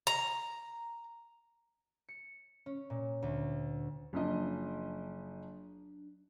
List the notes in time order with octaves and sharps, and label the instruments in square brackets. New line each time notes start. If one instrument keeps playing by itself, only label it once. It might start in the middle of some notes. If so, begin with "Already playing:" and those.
[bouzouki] A#5
[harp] C#7
C#4
A#2
D2
[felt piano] F#1 F3 D#5 [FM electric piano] F#3 D4